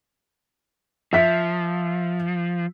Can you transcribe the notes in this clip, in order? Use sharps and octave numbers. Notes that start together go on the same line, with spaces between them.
F3 E5 B6